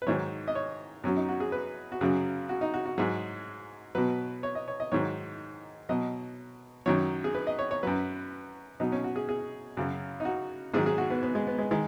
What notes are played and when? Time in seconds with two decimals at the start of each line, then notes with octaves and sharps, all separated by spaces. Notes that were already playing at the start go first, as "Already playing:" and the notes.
0.02 B4
0.07 G#2 D#3 F#3 C#5
0.48 D#5
0.55 C#5
1.04 F#2 F#3 C#4
1.16 D#4
1.29 F#4
1.40 G#4
1.52 B4
1.92 F#4
2.01 F#2 C#3 F#3 G#4
2.49 F#4
2.61 D#4
2.74 F#4
2.86 F#4
2.98 G#2 F#3 G#4
3.95 B2 F#3 B4
4.43 C#5
4.55 D#5
4.68 C#5
4.80 D#5
4.92 G#2 D#3 F#3 C#5
5.89 B2 F#3 D#5
6.86 F#2 D#3 F#3 C#5
7.24 G#4
7.35 B4
7.47 D#5
7.59 C#5
7.71 C#5
7.83 F#2 F#3 B4
8.80 B2 F#3 D#4
8.92 C#4
9.04 F#4
9.16 G#4
9.29 G#4
9.77 F#2 C#3 F#3
10.20 D#4
10.25 F#4
10.74 G#2 D#3 F#3 G#4
10.86 G#4
10.98 F#4
11.10 B3
11.23 B3
11.35 G#3
11.47 B3
11.59 G#3
11.71 D#3 G#3